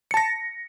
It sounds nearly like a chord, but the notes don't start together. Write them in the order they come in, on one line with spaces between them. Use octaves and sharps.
C#7 A5 A#6